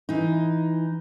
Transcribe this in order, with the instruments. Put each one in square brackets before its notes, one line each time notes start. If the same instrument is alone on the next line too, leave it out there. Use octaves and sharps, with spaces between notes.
[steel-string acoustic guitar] E3 D#4